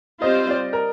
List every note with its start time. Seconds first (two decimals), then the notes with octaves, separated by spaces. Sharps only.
0.22 G3 C4 F4 C5 D#5
0.50 D5
0.73 A#4